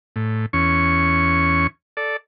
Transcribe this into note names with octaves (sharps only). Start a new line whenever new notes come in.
A2
E2 C#4 C#6
A4 D5